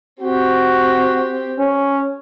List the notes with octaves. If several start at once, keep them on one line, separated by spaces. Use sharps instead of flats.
C4 F#4 G4
C#4